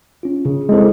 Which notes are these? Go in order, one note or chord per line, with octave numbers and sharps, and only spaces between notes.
C#4 F4
C#3
G#3 C4 E4 A4 C5